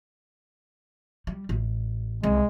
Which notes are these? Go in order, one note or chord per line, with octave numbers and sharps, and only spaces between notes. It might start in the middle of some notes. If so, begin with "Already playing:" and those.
G3
A1
C2 G#3